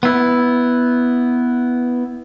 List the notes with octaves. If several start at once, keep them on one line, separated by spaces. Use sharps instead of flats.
B3 E4